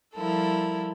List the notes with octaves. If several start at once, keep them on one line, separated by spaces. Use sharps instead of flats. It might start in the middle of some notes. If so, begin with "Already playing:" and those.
F3 G3 E4 A4 A#4